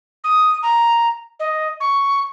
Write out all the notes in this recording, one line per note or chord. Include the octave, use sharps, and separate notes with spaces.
D#6
A#5
D#5
C#6